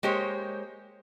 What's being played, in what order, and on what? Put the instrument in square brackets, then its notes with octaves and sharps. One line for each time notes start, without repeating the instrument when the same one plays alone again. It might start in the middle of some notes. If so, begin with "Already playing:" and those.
[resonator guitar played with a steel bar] G#3 A#3 G4 C5 C#5